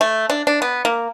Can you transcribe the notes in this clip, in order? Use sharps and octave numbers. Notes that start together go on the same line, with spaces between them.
A3
D4
D4
B3
A#3